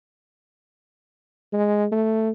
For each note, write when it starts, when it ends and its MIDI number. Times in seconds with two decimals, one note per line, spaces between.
1.53 1.87 56
1.92 2.31 57